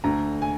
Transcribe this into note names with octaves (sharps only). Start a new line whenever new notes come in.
D2 D3 A#5
G#5